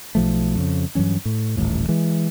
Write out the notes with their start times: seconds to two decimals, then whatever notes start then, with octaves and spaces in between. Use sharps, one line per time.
0.15 B1 F3 A3
0.56 F2 C#3
0.95 G2 E3 F#3 C#4
1.25 A2
1.57 D#1 A1 D#2 A2
1.88 E3 G#3